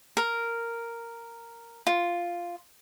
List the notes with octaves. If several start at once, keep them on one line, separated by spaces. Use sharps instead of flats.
A#4
F4